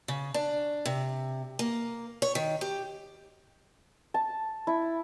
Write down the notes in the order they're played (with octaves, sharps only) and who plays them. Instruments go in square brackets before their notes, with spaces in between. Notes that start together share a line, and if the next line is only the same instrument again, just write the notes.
[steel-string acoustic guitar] C#3
D4
C3
A#3
C#5
D#3
G4
[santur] A5
E4